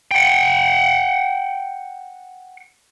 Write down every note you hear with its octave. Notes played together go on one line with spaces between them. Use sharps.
F#5 G5